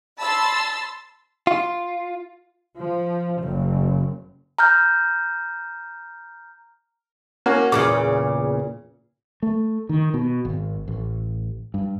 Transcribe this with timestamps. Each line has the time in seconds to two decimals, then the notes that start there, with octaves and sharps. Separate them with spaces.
0.19 A5 B5 C6 E6 A6
1.47 F4
2.77 F3
3.40 F#1
4.59 A#5 F6 G6
7.46 A#3 C#4 F#4
7.72 E2 A#2 C#3 D6
9.43 A3
9.89 D#3
10.14 B2
10.45 G#1
10.88 A1
11.74 G2